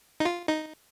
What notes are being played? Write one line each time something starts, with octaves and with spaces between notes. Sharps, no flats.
D#4
F4
D#4